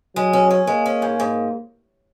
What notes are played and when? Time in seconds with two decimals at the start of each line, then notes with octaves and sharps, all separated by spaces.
0.16 F#3 G#3
0.33 C#4
0.50 C#4
0.67 G#3 A#3
0.86 C#4
1.02 G#2
1.20 G#2